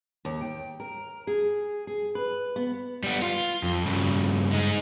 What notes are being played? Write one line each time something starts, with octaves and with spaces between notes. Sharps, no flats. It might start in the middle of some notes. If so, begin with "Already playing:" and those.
D#2
G5
A#4
G#4
G#4
B4
B3
G3 B3
F4
F2
G2 C#3
G#3 D#4